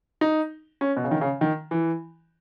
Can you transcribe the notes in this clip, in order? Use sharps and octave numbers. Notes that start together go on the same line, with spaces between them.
D#4
C#4
B2
C#3
D#3
C#3
D#3
E3